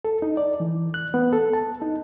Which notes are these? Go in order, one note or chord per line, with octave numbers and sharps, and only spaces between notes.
A4
D#4
D5
E3
F#6
B3
A4
A5
D#4